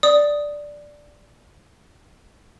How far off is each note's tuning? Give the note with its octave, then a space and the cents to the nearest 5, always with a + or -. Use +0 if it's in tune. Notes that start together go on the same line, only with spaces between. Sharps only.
D5 +0 D#6 +0